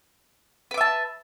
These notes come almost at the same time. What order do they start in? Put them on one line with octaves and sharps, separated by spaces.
B4 D6 E5 A5